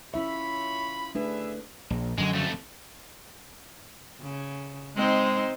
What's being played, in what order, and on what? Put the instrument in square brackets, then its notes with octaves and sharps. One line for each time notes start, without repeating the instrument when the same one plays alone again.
[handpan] C#4 E4 E5 [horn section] F4 C#5 B5
[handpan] A3 D4 B4 [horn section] G#4 E5
[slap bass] A#1
[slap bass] F#2 D3 F#3 [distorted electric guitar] G#3
[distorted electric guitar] F2 A3
[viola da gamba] C#3
[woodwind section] G#3 [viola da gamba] C4 D#4 C5